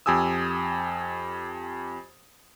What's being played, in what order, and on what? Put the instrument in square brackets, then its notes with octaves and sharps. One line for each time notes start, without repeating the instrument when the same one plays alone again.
[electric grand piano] F2 G4 G#5 D#6 E6